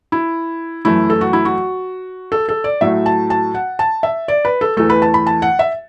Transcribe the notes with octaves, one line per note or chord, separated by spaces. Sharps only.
E4
F#2 E3 A3 E4
A4
F#4
E4
F#4
A4
A4
D5
A2 F#3 A3 E5
A5
A5
F#5
A5
E5
D5
B4
A4
E2 E3 A3 A4
B4
A5
B5
A5
F#5
E5